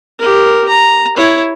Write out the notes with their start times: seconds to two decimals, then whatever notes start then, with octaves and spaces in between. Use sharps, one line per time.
0.19 G4 A#4
0.68 A#5
1.16 E4 C#5